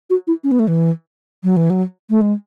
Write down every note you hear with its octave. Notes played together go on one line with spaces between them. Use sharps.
F#4
E4
C#4
B3
A3
E3
F#3
E3
F#3
A3
G#3